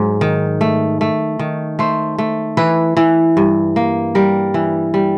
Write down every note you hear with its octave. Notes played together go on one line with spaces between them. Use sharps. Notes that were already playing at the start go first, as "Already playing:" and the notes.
Already playing: G#2 F#3
D#3
A3
A3
D#3
A3 C5
A3
E3 B4
E3
G2
A#3
G3 A#4
E3
G3